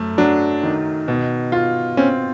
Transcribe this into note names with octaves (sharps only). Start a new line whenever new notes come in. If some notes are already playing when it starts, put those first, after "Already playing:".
Already playing: F#2 A3
F#3 D4
D#3
B2
F4
C4 C#4